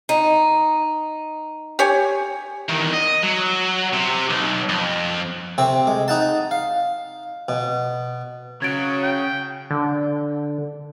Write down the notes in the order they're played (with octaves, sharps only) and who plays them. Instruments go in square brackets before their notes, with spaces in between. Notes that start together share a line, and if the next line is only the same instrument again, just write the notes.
[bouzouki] D#4
[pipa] G4 C#5 G#5
[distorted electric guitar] E2 D#3
D#5
F#3
C3
B1
F2
[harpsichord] C3 C4 C#6
G#3
D#4 F#5 A5
F5
B2
[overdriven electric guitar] C#3 [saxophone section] F#3 [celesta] G#6 A6 D7
[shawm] G5
[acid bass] D3